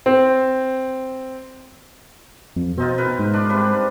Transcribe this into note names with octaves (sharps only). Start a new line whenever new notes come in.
C4
F2
B2 C4 D#4 F4
D#4 A#4 B4
G#2
D4 F4
C3 G3 B4